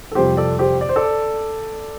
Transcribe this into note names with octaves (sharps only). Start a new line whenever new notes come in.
A4
F2 C3 G3 G4 C5
A4 D5
G4 C5
D5
C5
A4 D5